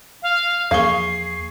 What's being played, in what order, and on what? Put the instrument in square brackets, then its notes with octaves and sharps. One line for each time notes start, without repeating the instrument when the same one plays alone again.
[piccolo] F5
[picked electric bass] E2 F3 A#3 [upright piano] G#4 C#6 G7 [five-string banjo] F5 [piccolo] C7